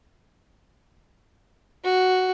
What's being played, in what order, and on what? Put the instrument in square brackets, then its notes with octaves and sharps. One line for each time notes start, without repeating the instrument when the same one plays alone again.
[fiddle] F#4